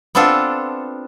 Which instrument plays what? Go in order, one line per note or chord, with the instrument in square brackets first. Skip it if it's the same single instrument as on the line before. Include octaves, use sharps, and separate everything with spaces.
[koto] B3 C4 D4 F4 A4